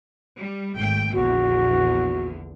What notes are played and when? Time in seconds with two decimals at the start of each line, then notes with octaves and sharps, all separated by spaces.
0.38 G3
0.76 G#1 A3 G5
1.13 A#1 E2 D3 F#4